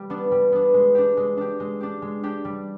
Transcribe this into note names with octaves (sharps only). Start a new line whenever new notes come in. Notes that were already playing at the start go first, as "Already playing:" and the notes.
Already playing: G3
B3 D4
G3
B3 D4
G#3
D4 G4
G#3
D4 G4
G#3
D4 G4
G#3
D4 G4
G3